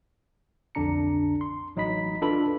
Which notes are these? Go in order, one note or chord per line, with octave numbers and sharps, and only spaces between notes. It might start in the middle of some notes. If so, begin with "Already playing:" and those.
B1 F2 D3 D4 A#5 C#7
C6
A1 F#3 D#4 D#5 B5 B6
D4 F4 A4 B4 B5